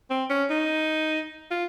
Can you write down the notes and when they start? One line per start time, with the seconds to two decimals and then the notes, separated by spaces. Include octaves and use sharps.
0.10 C4
0.29 C#4
0.50 D#4
1.51 F4